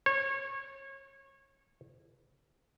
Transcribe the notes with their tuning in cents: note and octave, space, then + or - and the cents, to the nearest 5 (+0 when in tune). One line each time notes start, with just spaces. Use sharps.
C#5 -25